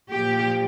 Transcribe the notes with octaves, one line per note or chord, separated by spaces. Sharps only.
A#2 F3 G4